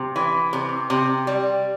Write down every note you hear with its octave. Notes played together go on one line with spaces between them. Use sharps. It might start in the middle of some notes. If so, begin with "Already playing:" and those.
Already playing: C3
E3
C3
C3
G3